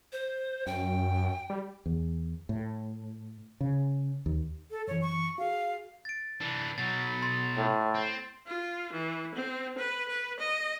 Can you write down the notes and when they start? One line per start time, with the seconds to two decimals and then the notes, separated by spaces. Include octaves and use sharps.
0.12 C5
0.67 F#2 G5
1.50 G3
1.86 E2
2.49 A2
3.61 C#3
4.26 D#2
4.71 A4
4.88 F#2 E3 C#5
5.01 C#6
5.38 F#4 G#4 F5
6.05 A6 D7
6.41 E3 D4
6.78 B2 F#3 A6
7.22 C6 A6
7.56 A2
7.95 C4
8.47 F4
8.93 E3
9.35 C4
9.78 B4
10.08 B4
10.39 D#5